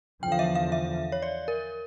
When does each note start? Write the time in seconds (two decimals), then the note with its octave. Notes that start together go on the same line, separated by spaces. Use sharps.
0.23 E2 D3 F3 G5
0.32 F5
0.39 E5
0.55 F5
0.72 E5
1.12 C#5
1.22 D5
1.48 A#4